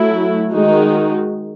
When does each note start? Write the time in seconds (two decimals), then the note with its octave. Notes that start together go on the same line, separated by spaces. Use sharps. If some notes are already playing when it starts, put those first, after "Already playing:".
Already playing: F#3 A3 E4
0.52 D#3 G#3 D#4 F#4